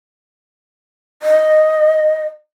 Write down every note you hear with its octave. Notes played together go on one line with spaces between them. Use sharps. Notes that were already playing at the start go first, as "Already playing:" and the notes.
D#5